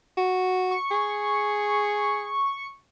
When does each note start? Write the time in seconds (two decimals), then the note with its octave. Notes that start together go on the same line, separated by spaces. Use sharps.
0.17 F#4
0.71 C#6
0.91 G#4